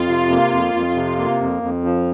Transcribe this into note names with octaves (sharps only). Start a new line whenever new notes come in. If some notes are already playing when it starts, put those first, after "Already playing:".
Already playing: F2 F4
C3
A#3
F2
F2
C3
A#3
F2
F2
F3